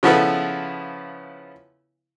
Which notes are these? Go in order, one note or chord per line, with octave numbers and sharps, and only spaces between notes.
C#3 F3 B3 E4 A4 B4